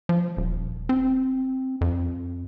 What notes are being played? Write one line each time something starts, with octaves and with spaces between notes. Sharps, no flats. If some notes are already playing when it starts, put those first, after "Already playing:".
F3
D#1
C4
F2